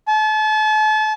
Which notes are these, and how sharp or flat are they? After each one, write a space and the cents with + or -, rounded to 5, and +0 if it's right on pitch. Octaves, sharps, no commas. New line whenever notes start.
A5 -40